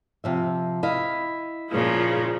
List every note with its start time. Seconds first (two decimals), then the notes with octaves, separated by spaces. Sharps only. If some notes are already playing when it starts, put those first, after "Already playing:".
0.24 C3 F3 E5
0.83 E4 D#5 F5
1.70 A#2 C#3 F3